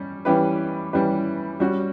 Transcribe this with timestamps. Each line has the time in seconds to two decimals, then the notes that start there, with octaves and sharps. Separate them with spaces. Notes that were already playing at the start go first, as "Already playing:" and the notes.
Already playing: G3 C#4
0.25 E3 G3 C#4 G4 B4
0.93 E3 G3 C#4 G4 B4
1.60 G3 C#4 F#4